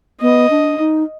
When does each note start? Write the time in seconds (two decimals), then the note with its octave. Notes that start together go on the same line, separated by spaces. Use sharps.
0.21 B3 D#5
0.50 D4
0.78 D#4